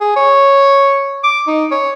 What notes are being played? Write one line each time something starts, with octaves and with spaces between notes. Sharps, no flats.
G#4
C#5
D6
D#4
C#5